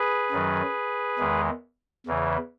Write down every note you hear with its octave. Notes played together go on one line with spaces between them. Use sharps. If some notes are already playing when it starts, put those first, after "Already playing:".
Already playing: G#4 B4
F#2 D#3 F#3
E2 D#3 G#3
E2 C#3 E3